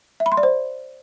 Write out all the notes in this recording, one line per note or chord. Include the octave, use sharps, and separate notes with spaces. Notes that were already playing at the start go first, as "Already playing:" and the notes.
E5
B5
C6
D5
C5